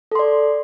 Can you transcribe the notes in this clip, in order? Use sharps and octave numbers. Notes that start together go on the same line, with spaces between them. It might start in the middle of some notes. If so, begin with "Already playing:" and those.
A4 D5 C6